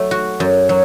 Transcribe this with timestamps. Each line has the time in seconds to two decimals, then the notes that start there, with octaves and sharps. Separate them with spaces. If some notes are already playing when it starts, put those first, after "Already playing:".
Already playing: F#3 A3
0.11 F#4
0.40 F#2
0.69 F#3